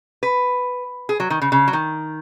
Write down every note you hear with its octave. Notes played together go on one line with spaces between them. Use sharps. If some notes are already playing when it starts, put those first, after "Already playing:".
B4
G#4
F#3
D#3
C#3
C#3
F#3
D#3